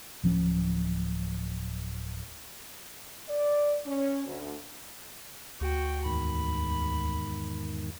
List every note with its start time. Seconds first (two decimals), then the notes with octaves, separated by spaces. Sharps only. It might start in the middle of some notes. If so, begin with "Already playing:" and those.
0.23 D1 F3 C#4
3.29 D5
3.85 C#4
4.26 D2
5.61 D2 F#4 G5
6.05 E2 G#2 D#3 B5